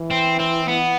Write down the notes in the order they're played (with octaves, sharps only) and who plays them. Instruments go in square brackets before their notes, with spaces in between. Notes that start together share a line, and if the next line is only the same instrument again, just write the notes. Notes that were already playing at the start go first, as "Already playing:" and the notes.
Already playing: [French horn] E3
[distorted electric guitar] C4
C4
B3